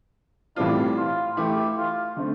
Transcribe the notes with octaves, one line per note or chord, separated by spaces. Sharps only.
A2 E3 G3 C4 D4 F4
F4
E3 A3 E4 G4
F4
D3 A3 C4